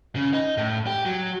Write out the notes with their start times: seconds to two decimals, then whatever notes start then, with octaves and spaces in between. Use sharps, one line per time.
0.16 C#3
0.33 D#4
0.57 A2
0.87 G4
1.06 F#3